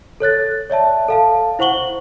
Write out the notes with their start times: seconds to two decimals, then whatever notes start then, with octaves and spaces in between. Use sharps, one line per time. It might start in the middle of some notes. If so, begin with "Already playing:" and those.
0.20 A4 C#5 F#6 A6
0.70 C#5 D5 E5 A5
1.08 A4 F5 A5
1.59 E4 C5 F#5 C#6 F#7 G7